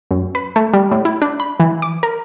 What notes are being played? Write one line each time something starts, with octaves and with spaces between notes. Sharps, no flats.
F#2
B4
A3
G3
A2
E4
D4
B5
E3
D6
A#4